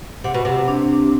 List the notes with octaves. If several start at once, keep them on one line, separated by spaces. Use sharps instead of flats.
C3 F#5
B2
C3
D4